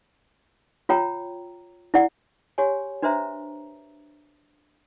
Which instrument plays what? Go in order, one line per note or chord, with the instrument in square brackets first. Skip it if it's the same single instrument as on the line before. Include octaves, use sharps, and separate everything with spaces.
[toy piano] F4 C#5 G5 A#5
E4 D5 F#5
F#4 G4 C#5 G#5
D4 F#4 B4 C5 E5 A#5